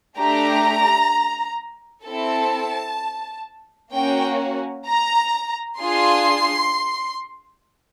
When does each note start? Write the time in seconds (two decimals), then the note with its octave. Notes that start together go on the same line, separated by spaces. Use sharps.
0.18 A3 D4 G4 A#5
2.05 C4 E4 A4 A5
3.93 A#3 C#4 F#4 G5
4.87 A#5
5.80 D4 F4 G#4 C6